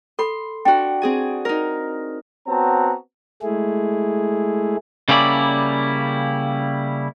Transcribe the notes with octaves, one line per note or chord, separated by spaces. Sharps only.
A4 B5 C6
D4 F#4 G5
C4 G#4 G#5
D#4 A#4
B3 C4 F#4 C#5 A5 A#5
G#3 A3 E4 G#4
C#3 G3 A#3 C#4 E4 D5